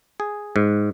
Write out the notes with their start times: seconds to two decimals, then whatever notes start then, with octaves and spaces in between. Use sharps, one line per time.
0.20 G#4
0.56 G#2